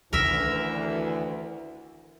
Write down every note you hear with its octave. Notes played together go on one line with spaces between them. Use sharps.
D2 D#3 E3 C#4 A#4 E5